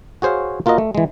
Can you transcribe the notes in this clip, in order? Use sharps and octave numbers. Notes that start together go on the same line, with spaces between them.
F#4 G#4 C5 C#5 F5
A#3 F4 F#4 A#4 D#5
A3
E3 G#3